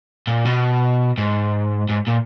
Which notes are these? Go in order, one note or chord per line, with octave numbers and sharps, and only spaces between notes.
A#2
B2
G#2
G#2
A#2